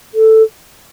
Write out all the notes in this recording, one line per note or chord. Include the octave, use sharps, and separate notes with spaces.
A4